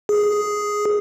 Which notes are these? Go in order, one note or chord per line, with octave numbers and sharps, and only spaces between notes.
G#4